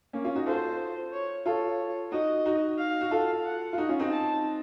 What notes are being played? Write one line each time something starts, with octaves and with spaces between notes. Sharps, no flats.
A#3 C#4
C#4 F4
D#4 F#4
F4 A4 C5
C#5
F4 A4 C#5
D#4 F#4 D#5
D#4 F#4
F5
F#4
F4 A4
F#5
F4
D#4 F#4
C#4 F4
C4 D#4
A5